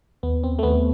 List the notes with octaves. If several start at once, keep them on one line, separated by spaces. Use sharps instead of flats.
D#2 B3
C4
A3
D#2 B3